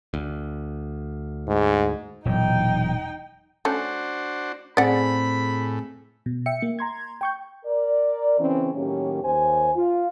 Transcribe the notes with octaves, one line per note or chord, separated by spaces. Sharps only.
D2
G#2
E1 A#2 F#3 D#4 G5
A3 C#4 D4 F#4 C5
A2 C4 G#4 D5 F#5 B5
B2
E5 G5 C#7
A#3
A#5 C6 G#6
G5 C#6 G6
A#4 D5
C#3 E3 C4 C#4
A2 D#3 F#3 A#3 C#4 G4
D#2 C5 G#5
F4